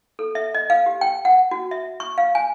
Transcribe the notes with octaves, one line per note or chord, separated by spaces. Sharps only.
A4
E5
D#5
F5
G4
G5
F#5
F#4
E5
C#6
F5
G#5